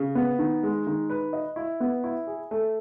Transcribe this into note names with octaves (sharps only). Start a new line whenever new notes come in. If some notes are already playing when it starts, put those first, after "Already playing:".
Already playing: C#3
B3
D#3
G#3
D#3
B4
D#5
E4
B3
E4
G#4
A3